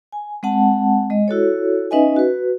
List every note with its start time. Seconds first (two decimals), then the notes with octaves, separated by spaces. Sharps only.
0.12 G#5
0.43 G#3 C4 F#5 A5
1.10 G#3 D#5
1.28 E4 F#4 A4 C#5
1.91 C#4 D#4 B4 D#5 E5 G#5
2.16 F#4 B4